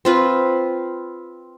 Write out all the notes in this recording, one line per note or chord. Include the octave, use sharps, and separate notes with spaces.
C4 F4 B4